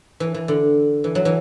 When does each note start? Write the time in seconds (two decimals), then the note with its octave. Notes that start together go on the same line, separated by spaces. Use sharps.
0.20 E3
0.34 E3
0.48 D3
1.04 E3
1.15 F#3
1.25 E3